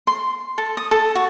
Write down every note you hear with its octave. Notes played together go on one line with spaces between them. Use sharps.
C6
A4
D#6
A4
F#4